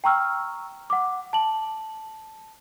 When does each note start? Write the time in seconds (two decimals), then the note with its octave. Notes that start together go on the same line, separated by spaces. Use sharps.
0.04 G5 A#5 C#6 E6 F6
0.90 F#5 D6
1.33 A5 F#7